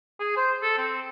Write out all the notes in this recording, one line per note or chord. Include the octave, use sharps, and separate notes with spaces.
G#4
C5
A4
C4